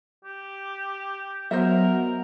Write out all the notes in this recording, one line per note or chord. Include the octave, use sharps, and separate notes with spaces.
G4
F#3 B3 A#4 C5 D#5 E5